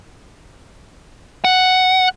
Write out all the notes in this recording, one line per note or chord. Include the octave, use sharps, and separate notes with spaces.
F#5